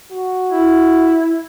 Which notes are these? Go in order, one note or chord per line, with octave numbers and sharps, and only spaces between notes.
F#4
E4